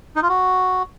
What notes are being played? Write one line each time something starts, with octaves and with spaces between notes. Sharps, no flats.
D#4
F4
F#4